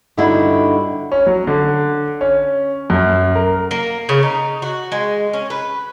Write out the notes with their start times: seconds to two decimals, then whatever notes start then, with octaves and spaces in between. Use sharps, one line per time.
0.17 G2 D3 G3 D#4 E4 F#4
1.12 C#4
1.27 F#3
1.47 D3
2.21 C#4
2.90 F#2
3.35 A#4
3.71 A#3
4.09 C#3
4.23 D#4
4.62 F#4
4.92 G#3
5.33 C#4
5.50 B4